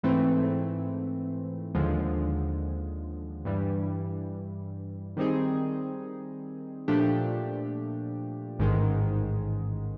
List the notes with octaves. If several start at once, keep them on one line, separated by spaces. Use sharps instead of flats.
G#2 E3 A3 C4
D#2 D3 F3 G#3
G2 E3 G3
D#3 G3 C4 D#4 G#4
A#2 F3 A3 D4 G4
A1 G#2 D#3 G#3